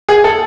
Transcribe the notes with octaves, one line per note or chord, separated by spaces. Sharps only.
G#4
A4